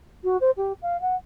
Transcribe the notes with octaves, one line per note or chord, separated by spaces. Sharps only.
F#4
C5
G4
F5
F#5